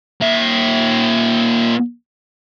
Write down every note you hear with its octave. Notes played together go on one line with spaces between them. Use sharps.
A#2 E5